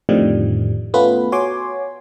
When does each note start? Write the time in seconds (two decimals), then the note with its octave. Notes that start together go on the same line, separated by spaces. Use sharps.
0.09 F2 A2 D3 D#3 F3 G3
0.94 A3 B3 C#4 F4 B4
1.32 F#4 C#5 G#5 C6 D6